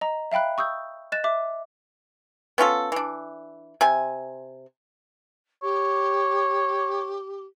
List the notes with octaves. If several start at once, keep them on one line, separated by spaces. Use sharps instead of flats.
D#5 A#5
E5 F5 G5 B5 F#6
C#6 D#6 E6 G6
D#5 F#6 A6 E7
E5 D6
B3 C#4 F4 A4
E3 D4
C3 G#5
G4 C#5